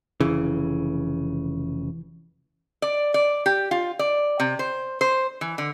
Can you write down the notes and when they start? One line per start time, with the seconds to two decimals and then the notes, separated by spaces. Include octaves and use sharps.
0.21 F1 A#1 C#3 E3
2.82 D5
3.14 D5
3.46 G4
3.71 F4
3.99 D5
4.40 C3
4.59 C5
5.01 C5
5.41 E3
5.58 D3